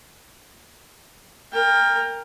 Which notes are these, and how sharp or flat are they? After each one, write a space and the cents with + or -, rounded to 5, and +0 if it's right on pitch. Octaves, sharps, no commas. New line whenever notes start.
A#4 +0 G5 +30